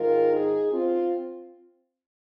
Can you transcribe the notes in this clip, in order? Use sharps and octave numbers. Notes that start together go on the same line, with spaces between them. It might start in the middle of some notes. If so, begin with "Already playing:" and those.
Already playing: G#2 D#3 G#3 F4 A#4
D#4 G#4
C4 F4